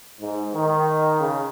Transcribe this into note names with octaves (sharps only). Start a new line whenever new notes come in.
G#2
D#3
C#3